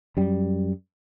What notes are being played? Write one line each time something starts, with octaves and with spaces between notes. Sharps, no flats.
F#2 G3